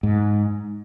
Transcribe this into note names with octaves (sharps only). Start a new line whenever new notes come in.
G#2